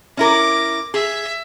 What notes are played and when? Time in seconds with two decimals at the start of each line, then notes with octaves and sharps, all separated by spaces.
0.17 C#4 E4 A#4 D6 A#6
0.94 G#4 E5